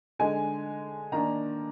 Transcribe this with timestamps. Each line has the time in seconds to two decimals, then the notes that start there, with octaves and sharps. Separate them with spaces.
0.19 D3 G#3 D#4 G#5
1.12 D#3 A#3 D4 A#5